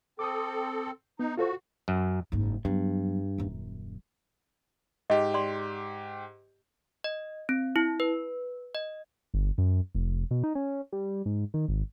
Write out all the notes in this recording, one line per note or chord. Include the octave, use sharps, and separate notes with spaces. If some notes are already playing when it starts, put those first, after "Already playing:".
C4 A4 D6 D#6
B3 D#4
F4 F#4 A4 C5
F#2
F#1 G#2
G2 F#3 B3
D#1 F#2
G#2 G4 D#5
D5 C6
D#5
C4
E4
B4
D#5
G1
F#2
F1
B2
D#4
C#4
G3
G#2
D#3
G#1